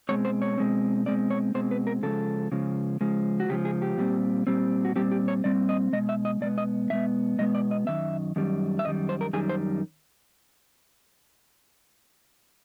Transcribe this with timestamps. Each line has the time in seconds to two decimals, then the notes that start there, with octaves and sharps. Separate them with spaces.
0.09 B2 G#3 C4 C#5
0.25 C5
0.42 C#5
0.57 B2 G#3 C4
1.06 B2 G#3 C4 D5
1.30 C#5
1.55 B2 G#3 C4 C5
1.71 B4
1.87 A#4
2.03 C#3 F3 G#3 A4
2.52 C#3 F3 G#3
3.01 C#3 F3 G#3
3.40 F#4
3.49 C#3 F3 G#3 G4
3.65 G#4
3.82 G4
3.98 A#2 G3 C4
4.47 A#2 G3 C4
4.85 F#4
4.96 A#2 G3 C4 G4
5.11 G4
5.28 C#5
5.44 A#2 G3 C4 D5
5.69 D#5
5.93 B2 G#3 D#5
6.09 E5
6.25 D#5
6.41 B2 G#3 B3 D5
6.58 D#5
6.90 B2 G#3 B3 E5
7.39 B2 G#3 B3 D#5
7.55 D5
7.71 D#5
7.87 F#2 D#3 E5
8.36 F#2 D#3 G3
8.79 E5
8.85 F#2 D#3 G3 D#5
9.09 C5
9.21 A#4
9.33 F#2 D#3 G3 G#4
9.49 C5